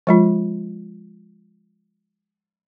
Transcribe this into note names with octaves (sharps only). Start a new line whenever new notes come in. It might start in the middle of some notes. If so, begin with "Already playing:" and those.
F3 G#3 F4